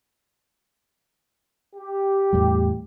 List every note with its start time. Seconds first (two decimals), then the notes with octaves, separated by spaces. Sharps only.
1.76 G4
2.33 E2 A2 G3